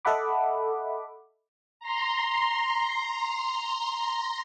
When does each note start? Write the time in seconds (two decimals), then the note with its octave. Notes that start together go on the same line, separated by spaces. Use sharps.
0.05 A4 D#5 E5 F#5 B5 D6
1.80 A#5 C6